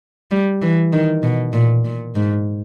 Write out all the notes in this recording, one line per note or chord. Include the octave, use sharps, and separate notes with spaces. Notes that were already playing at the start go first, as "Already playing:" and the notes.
G3
E3
D#3
B2
A#2
A#2
G#2